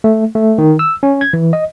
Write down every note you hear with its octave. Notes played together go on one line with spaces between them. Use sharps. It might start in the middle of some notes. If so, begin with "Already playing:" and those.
A3
A3
D#3
E6
C#4
G#6
E3
D#5